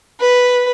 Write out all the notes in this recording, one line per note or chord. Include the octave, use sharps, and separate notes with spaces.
B4